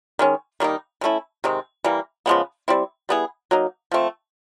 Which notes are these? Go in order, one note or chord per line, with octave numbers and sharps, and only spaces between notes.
D#3 G#3 C#4
D#3 G3 A#3 D#4
E3 A3 C#4 E4
C3 D#3 G#3 C4
E3 G3 A#3
C#3 F3 G#3 B3
G3 C4 E4
G3 B3 E4 G#4
F#3 A#3 D#4
F3 A3 C4